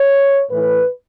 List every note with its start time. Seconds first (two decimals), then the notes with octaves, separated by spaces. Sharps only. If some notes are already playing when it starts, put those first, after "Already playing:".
Already playing: C#5
0.51 A2 E3 B4